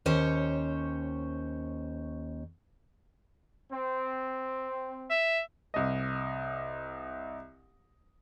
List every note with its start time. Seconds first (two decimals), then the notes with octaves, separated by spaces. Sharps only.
0.06 D#2 C#4 C5 C#5
3.72 C4
5.10 E5
5.74 C2 D#5